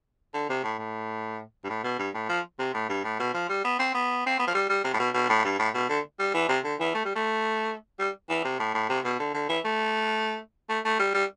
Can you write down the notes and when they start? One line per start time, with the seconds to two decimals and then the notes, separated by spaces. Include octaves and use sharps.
0.34 D3
0.49 C3
0.64 A2
0.79 A2
1.64 G2
1.69 A2
1.84 B2
1.99 G2
2.14 A2
2.29 F3
2.59 C3
2.74 A2
2.89 G2
3.04 A2
3.19 B2
3.34 F3
3.49 G3
3.65 B3
3.79 C4
3.94 B3
4.26 C4
4.39 B3
4.47 F3
4.54 G3
4.69 G3
4.84 C3
4.93 A2
4.99 B2
5.14 B2
5.29 A2
5.44 G2
5.59 A2
5.74 B2
5.89 D3
6.19 G3
6.34 E3
6.49 C3
6.64 D3
6.80 E3
6.95 A3
7.05 G3
7.15 A3
7.99 G3
8.29 E3
8.45 C3
8.60 A2
8.74 A2
8.89 C3
9.05 B2
9.20 D3
9.34 D3
9.49 E3
9.65 A3
10.69 A3
10.85 A3
11.00 G3
11.14 G3